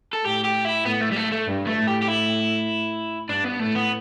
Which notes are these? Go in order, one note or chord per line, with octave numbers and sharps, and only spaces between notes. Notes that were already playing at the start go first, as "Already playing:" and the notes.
A4
A2 G4
G4
E4
A2 B3
A3
G3
A3
A3
G2
A3
A2
G4
G4
E4
G2 D4
B3
A2 A3
B3